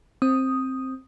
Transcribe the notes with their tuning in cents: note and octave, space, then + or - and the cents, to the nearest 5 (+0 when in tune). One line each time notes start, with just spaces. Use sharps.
C4 +10 D#6 +0